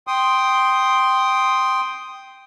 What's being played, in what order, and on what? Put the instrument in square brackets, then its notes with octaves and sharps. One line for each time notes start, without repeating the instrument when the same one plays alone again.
[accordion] G5 C6 D#6